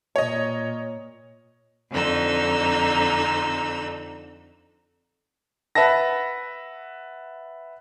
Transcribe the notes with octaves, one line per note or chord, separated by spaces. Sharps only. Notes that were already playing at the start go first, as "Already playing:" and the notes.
A#2 C#5 D#5
F2 D3 D#4 E6
B4 E5 F#5 A5 A#6